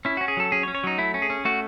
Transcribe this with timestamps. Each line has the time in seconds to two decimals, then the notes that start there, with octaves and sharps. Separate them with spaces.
0.05 C#4 E4
0.17 C#4 F#4
0.28 G#4
0.37 F#3 A4
0.52 C#4 G#4
0.63 C#5
0.68 C#4
0.75 C#5
0.84 F#3 D#4
0.98 A3 E4
1.14 C#4
1.22 G#4
1.30 C#4
1.45 A3 F#4